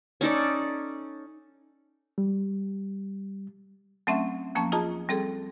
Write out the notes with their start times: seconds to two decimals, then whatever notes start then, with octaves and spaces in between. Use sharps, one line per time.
0.21 C#4 D#4 A4 D5
2.18 G3
4.07 F#3 A3 C4 C#4 E5
4.55 D#2 F3 A#3 C#4 A5 C#6
4.72 D#4 F4 G#4 D#5 A5 A#5
5.09 G3 C4 G#4 A4